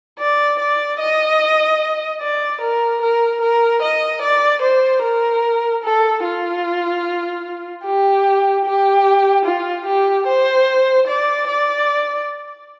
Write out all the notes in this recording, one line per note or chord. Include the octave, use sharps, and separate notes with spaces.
D5
D5
D#5
D5
A#4
A#4
A#4
D#5
D5
C5
A#4
A4
F4
G4
G4
F4
G4
C5
D5
D5